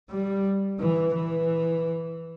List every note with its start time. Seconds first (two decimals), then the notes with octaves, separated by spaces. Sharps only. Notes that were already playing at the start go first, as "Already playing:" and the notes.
0.10 G3
0.80 E3
1.15 E3